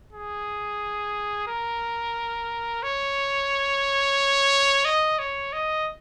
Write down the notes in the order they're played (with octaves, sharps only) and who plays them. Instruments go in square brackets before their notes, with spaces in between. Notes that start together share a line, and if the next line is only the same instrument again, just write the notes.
[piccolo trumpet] G#4
A#4
C#5
D#5
C#5
D#5